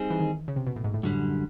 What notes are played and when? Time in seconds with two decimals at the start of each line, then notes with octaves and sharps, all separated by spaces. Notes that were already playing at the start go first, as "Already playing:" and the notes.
Already playing: G3 C4 D#4 G#4
0.10 E3
0.20 D#3
0.48 C#3
0.56 C3
0.67 B2
0.76 A2
0.84 G#2
0.94 A2
1.03 F#2 D3 G3